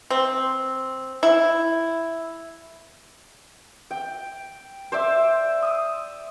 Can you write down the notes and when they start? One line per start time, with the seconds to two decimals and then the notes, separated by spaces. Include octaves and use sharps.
0.10 C4
1.23 E4
3.91 G5
4.92 C5 D5 E5
5.63 D#6 E6